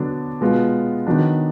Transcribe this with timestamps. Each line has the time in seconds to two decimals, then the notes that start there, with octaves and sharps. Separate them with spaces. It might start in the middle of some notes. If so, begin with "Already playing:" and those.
Already playing: D3 F#3 B3 D4
0.41 B2 G#3 B3 F4
1.07 D#3 F#3 B3 D4